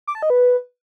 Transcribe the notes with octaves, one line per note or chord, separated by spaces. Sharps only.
D6
A5
D#5
B4